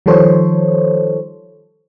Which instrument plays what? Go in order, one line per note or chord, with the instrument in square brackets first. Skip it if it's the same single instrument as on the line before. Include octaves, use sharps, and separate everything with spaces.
[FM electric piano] D#3 F3 G3 A4 C5 C#5